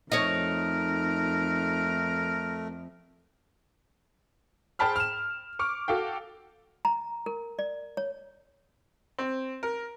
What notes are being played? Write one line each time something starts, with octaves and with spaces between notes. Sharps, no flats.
F2 A3 D#4 A#4 C#5
G#4 C5 G5 A5 B5 F6
F6 E7
C#6 D6 F6
F#4 A4 F5 G5
A#5
A#4
D5
C#5
C4
A#4